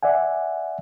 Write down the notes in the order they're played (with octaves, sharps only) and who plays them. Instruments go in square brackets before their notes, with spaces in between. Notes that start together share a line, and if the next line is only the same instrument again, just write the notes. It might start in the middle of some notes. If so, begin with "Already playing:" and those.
[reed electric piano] D5 E5 F#5 G#5